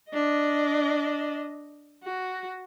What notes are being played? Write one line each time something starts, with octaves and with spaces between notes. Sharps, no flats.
D4 D#5
F#4